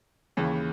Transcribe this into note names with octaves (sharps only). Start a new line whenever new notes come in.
D#2 C#3 E3